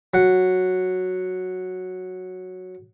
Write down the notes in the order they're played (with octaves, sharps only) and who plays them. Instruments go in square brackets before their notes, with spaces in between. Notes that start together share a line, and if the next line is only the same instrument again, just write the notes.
[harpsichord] F#3 F#5